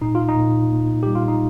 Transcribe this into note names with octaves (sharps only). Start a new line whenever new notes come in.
A#2 D#4
F4
D#4
A#2
A#3
G3 G4
F4
D#4